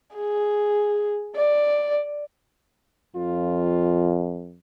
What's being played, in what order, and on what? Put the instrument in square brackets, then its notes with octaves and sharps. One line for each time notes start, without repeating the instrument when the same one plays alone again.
[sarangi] G#4
D5
[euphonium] F2 [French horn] F4